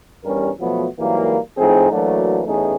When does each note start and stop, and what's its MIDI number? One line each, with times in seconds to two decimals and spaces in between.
0.24 0.50 40
0.24 0.50 43
0.24 0.50 55
0.24 0.50 61
0.24 0.50 70
0.60 0.86 47
0.60 0.86 53
0.60 0.86 54
0.60 0.86 57
0.60 0.86 59
0.99 1.38 44
0.99 1.38 52
0.99 1.38 54
0.99 1.38 55
0.99 1.38 58
1.58 1.91 45
1.58 1.91 53
1.58 1.91 60
1.58 1.91 63
1.58 1.91 68
1.92 2.41 52
1.92 2.41 54
1.92 2.41 57
1.92 2.41 58
1.92 2.41 62
1.92 2.41 66
2.46 2.74 33
2.46 2.74 40
2.46 2.74 57
2.46 2.74 61
2.46 2.74 63
2.46 2.74 68